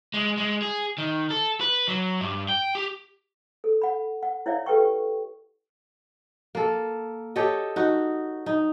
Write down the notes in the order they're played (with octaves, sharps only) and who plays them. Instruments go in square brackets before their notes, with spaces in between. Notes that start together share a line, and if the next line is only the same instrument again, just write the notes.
[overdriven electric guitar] G#3
G#3
G#4
D#3
A4
B4
F#3
G2
G5
G4
[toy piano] A4
F#5 B5
F#5
E4 C#5 D5 E5 F5
G4 A4 B4 G5 C#6
[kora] A#3 A4
G4 A4 C#5 D#5
D#4 F#4
D#4